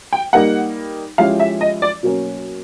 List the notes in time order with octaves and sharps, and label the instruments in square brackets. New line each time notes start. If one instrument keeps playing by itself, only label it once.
[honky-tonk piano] G5
[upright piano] G3 A#3 D#4 [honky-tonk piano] F#5
[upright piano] F3 G#3 C#4 E4 G4 [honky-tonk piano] F5
[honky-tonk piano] E5
D#5
D5
[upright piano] B2 F#3 A#3 C#4